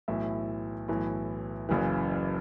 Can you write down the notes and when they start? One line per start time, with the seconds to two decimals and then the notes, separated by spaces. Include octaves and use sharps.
0.08 B1 A2 E3 E5
0.88 B1 A2 E3
1.69 F#1 F#2 C#3 E3